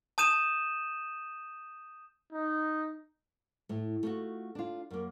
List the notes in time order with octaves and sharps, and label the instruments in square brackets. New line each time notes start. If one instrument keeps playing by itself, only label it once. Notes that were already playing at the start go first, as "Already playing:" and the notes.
[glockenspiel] A5 D#6 G6 D#7 E7
[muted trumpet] D#4
[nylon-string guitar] A2 A3
A3 F4 F#4
D4 F4
F#2 A#3